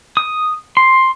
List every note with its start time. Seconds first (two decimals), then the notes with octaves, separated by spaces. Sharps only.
0.17 D#6
0.77 C6